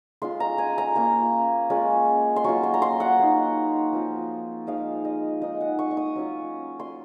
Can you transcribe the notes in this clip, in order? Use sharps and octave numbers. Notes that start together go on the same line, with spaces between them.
G#3 C#4 F4 C6
A#5
G#5
A#5
A#3 C#4 F4
G#3 C#4 F4
C6
F#3 C#4 F4 C#6
C6
A#5
C6
F#5
A#3 D#4
F3 C4 F4
F3 G#3 D#4 F5
D#5
G#3 D#4 D#5
F#5
C#6
C#6
D#6
F#3 C#4 F4
C6